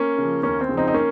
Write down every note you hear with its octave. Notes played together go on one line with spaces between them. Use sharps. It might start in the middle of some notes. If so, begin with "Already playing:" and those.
Already playing: A#3 C#4
C#3 F3
D#2 A#3 C#4
C4
C#3 F3
C4 D#4
D#4
A#3 C#4